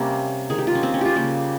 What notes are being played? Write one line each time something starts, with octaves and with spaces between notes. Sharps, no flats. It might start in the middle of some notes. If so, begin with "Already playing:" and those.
Already playing: C3 G3 A#3 C#4
D#3 G#3 G#4
G4
F4
C#4
C4
C#4
F4 G4
C#3 G3 A#3 G4